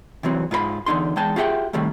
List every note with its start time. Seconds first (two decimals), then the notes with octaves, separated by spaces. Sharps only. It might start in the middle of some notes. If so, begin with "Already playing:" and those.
0.23 C3 E3 F#3 C4
0.51 G#2 F4 A#4 B5
0.86 E2 D3 D#4 C6
1.16 E2 G#3 G5 A5
1.36 F4 G4 G#4 E5 F#5 G5
1.73 A2 C3 D#3 G3 A3